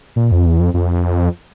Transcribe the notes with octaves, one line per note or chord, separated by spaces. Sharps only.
A#2
F2
E2
F2
F2